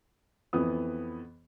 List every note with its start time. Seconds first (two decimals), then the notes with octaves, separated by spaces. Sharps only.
0.53 F2 E3 B3 D#6